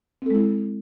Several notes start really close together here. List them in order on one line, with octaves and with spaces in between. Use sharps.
C4 A4 G#3 E4